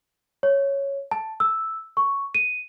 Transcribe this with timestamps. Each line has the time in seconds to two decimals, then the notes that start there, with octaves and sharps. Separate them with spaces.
0.43 C#5
1.11 A5
1.40 E6
1.97 C#6
2.35 D#7